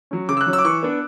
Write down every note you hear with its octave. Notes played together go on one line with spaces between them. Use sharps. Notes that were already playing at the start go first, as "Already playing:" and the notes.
F#3 C#4
C#3 D6
E6
F#6
F#3 C#4
E6
D6
E3 C#6
B3 D4